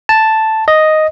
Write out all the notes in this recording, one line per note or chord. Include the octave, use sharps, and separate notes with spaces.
A5
D#5